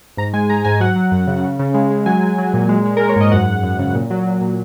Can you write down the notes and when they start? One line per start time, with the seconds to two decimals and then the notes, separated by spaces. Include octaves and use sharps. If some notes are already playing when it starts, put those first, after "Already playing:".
0.17 G#2 A#5
0.33 G#3 G#5
0.50 G#3 A#5
0.65 G#2 G#5
0.80 F#3 F#5
0.96 F#3
1.12 F#2
1.27 C#3
1.44 C#3
1.59 C#3
1.74 G#3
1.90 G#3
2.06 F#3 G#5
2.22 F#3
2.38 F#3
2.54 A#2
2.69 G#3
2.85 G#3
2.97 G#3 A#4
3.09 C#5
3.16 G#2 D#5
3.32 F#2 F#5
3.47 F#2
3.63 F#2
3.79 C#3
3.95 A#2
4.10 F#3
4.26 A#2
4.41 A#2